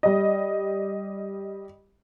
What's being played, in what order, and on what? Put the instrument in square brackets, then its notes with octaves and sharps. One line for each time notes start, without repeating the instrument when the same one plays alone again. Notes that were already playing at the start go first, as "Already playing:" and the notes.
[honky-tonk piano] G3 D#5